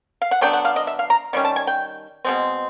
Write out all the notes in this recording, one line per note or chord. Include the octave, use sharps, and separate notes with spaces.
F5
F#5
D3 F#3 B3 D4 G5
F#5
F5
D#5
E5
F5
A#5
D#3 G3 C#4
A5
G#5
G5
B2 G#3 C4